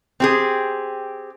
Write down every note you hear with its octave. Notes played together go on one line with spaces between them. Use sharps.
C4 G4 G#4